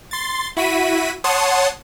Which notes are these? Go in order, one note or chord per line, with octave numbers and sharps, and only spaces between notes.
C6 A6
E4 F#4 B6 D#7
C#5 F#5 A5 C6 D#6